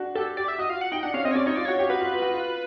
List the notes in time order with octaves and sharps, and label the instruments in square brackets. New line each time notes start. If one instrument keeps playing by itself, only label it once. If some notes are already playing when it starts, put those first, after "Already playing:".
Already playing: [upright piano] D4 F#4
[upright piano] G4 [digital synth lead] A4
[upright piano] G4 [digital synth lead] D5
[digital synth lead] E5
[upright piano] F#4 [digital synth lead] D#5
[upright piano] F4 [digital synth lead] F5
[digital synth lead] F#5
[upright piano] D#4 [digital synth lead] G5
[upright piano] D4 [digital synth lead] F#5
[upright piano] C#4 [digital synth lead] F5
[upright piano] C4 [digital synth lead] D#5
[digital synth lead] C#5
[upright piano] C#4 [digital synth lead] D5
[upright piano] D#4 [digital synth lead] C#5
[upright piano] F4 [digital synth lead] D5
[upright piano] F#4 [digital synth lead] C#5
[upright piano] G4
[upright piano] F#4 [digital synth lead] B4
[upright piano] F4
F4
F#4
F4